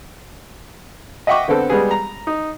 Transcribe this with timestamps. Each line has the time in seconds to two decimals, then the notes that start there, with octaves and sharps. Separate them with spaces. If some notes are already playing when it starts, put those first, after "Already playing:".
1.27 D#5 E5 F#5 G5 C#6 D6
1.48 D3 B3 C4 A4
1.70 G3 G#3 B3 G4 G#4
1.91 A#5
2.27 D#4